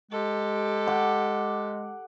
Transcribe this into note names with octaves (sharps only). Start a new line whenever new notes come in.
G#3 G4 A4
F#5 D6